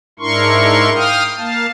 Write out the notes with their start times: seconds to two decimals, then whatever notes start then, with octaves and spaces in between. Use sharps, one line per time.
0.20 G#2 D4 E4 A#4 C6 C#6
0.94 F5 G5 D#6 F6
1.37 A#3 F5 A5